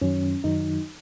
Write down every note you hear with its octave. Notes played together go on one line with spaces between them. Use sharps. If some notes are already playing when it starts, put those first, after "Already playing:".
F#2 D#3 F#3 C#4
F#2 D#3 F#3 D#4